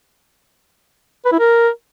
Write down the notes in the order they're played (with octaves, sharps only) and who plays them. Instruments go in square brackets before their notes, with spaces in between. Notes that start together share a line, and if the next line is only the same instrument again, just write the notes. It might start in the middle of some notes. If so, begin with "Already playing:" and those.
[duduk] B4
E4
A#4